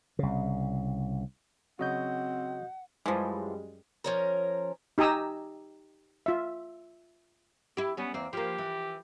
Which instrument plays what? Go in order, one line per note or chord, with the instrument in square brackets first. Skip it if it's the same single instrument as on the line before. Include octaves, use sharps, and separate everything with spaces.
[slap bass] C2 C#3
[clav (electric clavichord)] C#3 F#3 [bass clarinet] C4 [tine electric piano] F#4 D#5 G6 [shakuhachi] F#5
[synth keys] F#2 G3 G#3 [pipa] E3 F3
[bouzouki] F3 C#4 A#4
[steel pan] D#4 G4 G#5 A#5 D#6 E6
F4 E5
[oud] E4 G4
[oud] G3 C#4 [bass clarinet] B3
[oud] E2 C4 [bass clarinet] A#3
[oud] F3 A#3 [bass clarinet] G4
[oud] E3